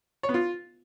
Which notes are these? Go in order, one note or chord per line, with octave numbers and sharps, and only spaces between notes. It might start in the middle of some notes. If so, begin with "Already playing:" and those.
C#5
B3
F4